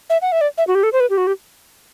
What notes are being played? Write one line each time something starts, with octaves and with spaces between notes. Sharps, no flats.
E5
F#5
E5
D5
E5
F#4
G4
A4
C5
B4
G4
F#4
G4